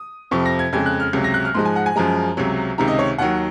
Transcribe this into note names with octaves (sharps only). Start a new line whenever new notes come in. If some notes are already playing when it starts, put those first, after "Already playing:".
Already playing: D#6
F2 C3 F3 C#6
A#6
G#6
F2 C#3 G#3 G#6
F#6
F6
C#2 C3 F#3
A#6
F#6
F6
G#2 F3 G#3 C6
G#5
F#5
G#5
F#2 F3 G#3 A#5
C#2 C3 F#3
C#2 C3 D#3 A#5
D#5
C#5
D#2 D#3 F#3 F#5